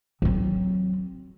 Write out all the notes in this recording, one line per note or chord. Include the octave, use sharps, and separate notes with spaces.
F#3 C4